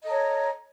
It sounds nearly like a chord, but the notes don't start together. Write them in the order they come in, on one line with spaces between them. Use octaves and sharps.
D#5 A4 A#5 C#5